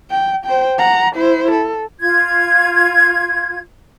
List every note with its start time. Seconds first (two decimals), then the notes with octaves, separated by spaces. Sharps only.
0.11 G5
0.46 C5 G5
0.78 F#5 A#5
1.15 E4 C5
1.52 A4
2.00 F4 G#6